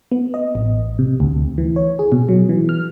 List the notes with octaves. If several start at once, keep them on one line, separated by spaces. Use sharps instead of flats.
B3
D#5
A1
C3
D2
E3
C#5
G#4
B2
F#3
E3
F6